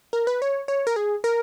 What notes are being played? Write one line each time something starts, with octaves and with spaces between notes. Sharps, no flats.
A#4
B4
C#5
C#5
A#4
G#4
A#4